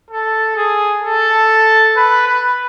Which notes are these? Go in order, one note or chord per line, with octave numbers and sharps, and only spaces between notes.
A4
G#4
A4
B4
B4